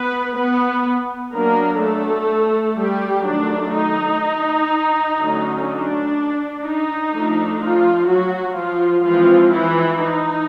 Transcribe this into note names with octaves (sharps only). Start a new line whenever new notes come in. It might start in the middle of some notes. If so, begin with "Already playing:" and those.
Already playing: B3 B4
B3 B4
F#3 A#3 B3 D4 A#4
A3 A4
G3 G4
D#3 F#3 A3 D4
D#4
D3 F#3 A3 C#4
D4
D#4
F3 A3 D4
F3 F4
F#3 F#4
F3 F4
E3 F3 G#3 C4 F4
E3 E4
D#4